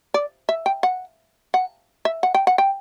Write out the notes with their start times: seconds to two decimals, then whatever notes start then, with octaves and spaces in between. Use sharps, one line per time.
0.14 D5
0.49 E5
0.66 G5
0.83 F#5
1.54 F#5
2.05 E5
2.23 F#5
2.34 G5
2.47 F#5
2.58 G5